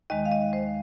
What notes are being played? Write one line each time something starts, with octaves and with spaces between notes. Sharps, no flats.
D#2 D#3 G#3 D#5
F5
D#5
C5